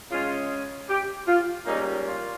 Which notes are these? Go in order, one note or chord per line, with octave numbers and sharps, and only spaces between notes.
C#3 G#3 C#4 F4
G4
F4
G#2 G3 A#3 C#4 D#4
F4